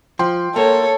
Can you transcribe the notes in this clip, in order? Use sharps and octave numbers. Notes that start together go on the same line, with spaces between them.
F3 G5 C6
A#3 A4 C#5